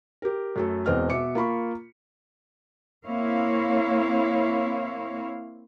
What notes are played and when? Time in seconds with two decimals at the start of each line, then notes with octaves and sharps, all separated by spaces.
0.22 G4 A#4
0.56 F#2 A3 A4
0.86 E1 E2 C4 D#5 F6
1.10 B2 E5 D6 C#7
1.35 A#3 F4 B5 C#6
3.05 A#3 C4 E4 C#5 F5